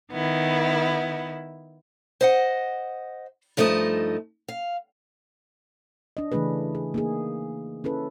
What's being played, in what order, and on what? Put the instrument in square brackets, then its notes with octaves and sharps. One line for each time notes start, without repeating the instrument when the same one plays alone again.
[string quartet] D#3 B3 E4
[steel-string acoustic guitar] C5 D#5 F#5
G2 F3 A3 D#4 G#4 D#5
F5
[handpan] D4 D#5
C#3 E3 A3 D4 G#4 B4
G#4
A#3 D#4 G#4
C#4 E4 A4 B4